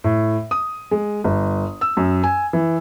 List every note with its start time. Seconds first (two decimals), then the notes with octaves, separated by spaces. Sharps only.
0.04 A2
0.51 D#6
0.91 G#3
1.24 G1
1.81 E6
1.97 F#2
2.24 G#5
2.53 E3